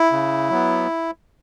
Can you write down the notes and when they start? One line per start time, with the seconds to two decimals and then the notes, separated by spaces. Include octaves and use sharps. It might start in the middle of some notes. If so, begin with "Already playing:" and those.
Already playing: E4
0.12 C#3
0.50 F#3 B3